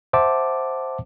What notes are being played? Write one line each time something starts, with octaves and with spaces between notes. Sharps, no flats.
C5 E5 F#5 A5 D6